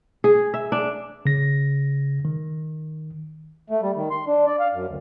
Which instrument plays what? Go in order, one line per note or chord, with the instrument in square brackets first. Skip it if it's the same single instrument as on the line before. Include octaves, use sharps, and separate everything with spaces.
[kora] G#4
E5
D4
[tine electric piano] C#3 A#6
D#3
[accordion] A3
G3
D#3
C6
D4
D5
F5
F#2
D2